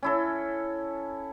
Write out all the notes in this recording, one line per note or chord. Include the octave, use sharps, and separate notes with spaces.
C#4 E4 A4